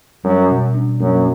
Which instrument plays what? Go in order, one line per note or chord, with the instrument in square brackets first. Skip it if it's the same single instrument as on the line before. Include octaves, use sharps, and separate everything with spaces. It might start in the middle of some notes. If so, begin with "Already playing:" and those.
[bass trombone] F#2 [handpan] G3
[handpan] B2
D4
[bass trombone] F#2 [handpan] A#3